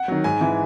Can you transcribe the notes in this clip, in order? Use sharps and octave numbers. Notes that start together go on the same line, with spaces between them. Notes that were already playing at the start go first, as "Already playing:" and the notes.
Already playing: F#5
D#3 F#3
G#2 G#5
E3